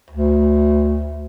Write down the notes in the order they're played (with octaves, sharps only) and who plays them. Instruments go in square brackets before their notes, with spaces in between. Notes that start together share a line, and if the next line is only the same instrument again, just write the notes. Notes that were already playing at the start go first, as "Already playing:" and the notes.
[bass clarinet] D2